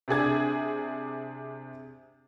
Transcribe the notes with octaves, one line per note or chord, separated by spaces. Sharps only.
C3 D4 G#4 G#6